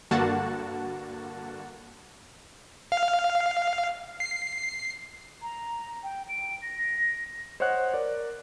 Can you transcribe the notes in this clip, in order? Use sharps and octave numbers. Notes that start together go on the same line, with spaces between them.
G2 D3 A#3 F#4 F#5 A5
F5
C7
A#5
G5
D7
A#6
C5 C#5 D#5 F#5 F#6
A#4 D5